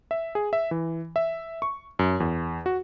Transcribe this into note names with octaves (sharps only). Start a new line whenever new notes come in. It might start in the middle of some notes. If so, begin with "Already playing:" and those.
E5
G#4
E5
E3
E5
C#6
F#2
E2
F#4